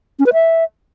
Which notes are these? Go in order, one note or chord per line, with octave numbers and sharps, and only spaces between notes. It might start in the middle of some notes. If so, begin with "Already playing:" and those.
C#4
B4
E5